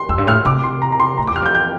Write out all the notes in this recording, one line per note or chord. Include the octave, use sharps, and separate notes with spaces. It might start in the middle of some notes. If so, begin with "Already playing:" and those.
Already playing: C6
F2 E6
G2
A2 F6
C3 D6
C6
A#5
A#5
C6
A2 A#5
D6
E2
F6
F2 G6
G6